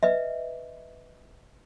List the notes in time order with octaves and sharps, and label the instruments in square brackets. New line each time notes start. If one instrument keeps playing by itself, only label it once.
[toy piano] B4 D#5 E5